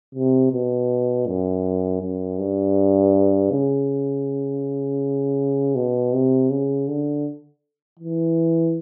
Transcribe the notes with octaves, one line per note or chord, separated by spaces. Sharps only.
C3
B2
F#2
F#2
G2
C#3
B2
C3
C#3
D3
E3